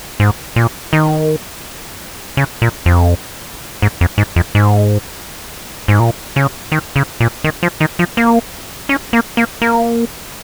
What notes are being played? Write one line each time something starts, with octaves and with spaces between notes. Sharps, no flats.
G#2
A#2
D#3
C#3
A#2
F2
G#2
F2
G#2
F2
G#2
G#2
A#2
C#3
D#3
C#3
A#2
D#3
F3
D#3
F3
A#3
C#4
A#3
A#3
A#3